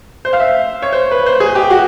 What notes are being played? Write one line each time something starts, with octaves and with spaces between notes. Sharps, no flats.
C5
F5
E5
C#5
C5
B4
C5
G#4
G4
F#4